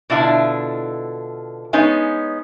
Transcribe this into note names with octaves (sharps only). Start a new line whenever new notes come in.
B2 D3 D4 E4 F4
G#3 B3 C#4 D#4